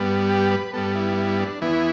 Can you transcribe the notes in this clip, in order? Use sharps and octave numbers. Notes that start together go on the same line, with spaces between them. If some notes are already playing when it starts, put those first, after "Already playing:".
Already playing: G2 G3 B3
G4
B4
G2 G3 B3 A4
E4
E4
D4
E2 E3 B3 E4